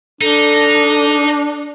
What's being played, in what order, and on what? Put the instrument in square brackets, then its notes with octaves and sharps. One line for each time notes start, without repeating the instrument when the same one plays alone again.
[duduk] D4 [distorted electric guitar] D#4 [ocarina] A4